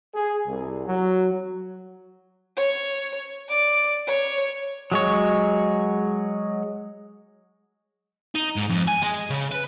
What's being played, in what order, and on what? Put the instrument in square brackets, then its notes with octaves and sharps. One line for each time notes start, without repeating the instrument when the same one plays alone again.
[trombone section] G#4
C2
F#3
[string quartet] C#5
D5
C#5
[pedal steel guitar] F#3 G#3 C#5
[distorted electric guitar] D#4
G#2
F2
G#5
G#3
C#3
B4